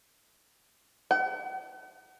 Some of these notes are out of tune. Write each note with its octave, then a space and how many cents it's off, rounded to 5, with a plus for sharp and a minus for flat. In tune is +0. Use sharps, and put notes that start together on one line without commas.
F#5 +45